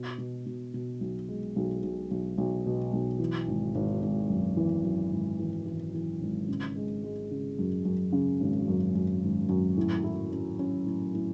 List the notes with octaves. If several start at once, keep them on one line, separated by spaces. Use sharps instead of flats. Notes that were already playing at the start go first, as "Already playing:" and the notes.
Already playing: B2
B2
B2
B2
B1
G#3
B1
B1
B1
B1
B2
B1
E3
G#1
G#1
G#1
F#2
E3
F#2
G#1
E3
E3
E3
G#1
C#3
G#3
G#3
C#3
F#2
F#2
C#3
G#1
F#2
F#2
G#1
F#2
A2
E4
C#4
C#4
A2
A2